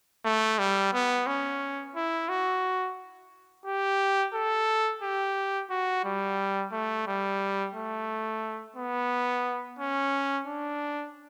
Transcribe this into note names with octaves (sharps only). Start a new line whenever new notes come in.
A3
G3
B3
C#4
E4
F#4
G4
A4
G4
F#4
G3
A3
G3
A3
B3
C#4
D4